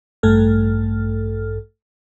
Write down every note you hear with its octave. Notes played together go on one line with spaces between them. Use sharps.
A1 G2 A3 A4 F6